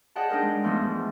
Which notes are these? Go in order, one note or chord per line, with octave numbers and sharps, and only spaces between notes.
G#4 D5 D#5 F#5 G5 A5
D4 D#4 G#4 A#4 D#5
G#3
E2 G#2 F3 A3 D#4
G#2